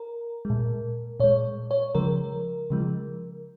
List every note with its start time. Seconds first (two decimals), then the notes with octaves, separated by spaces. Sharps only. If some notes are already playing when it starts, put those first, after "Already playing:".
Already playing: A#4
0.45 G#3
0.50 A#2
1.20 A#2 G#3 C#5
1.71 C#5
1.95 C#3 F3 G#3 A#4
2.70 C#3 F3 G#3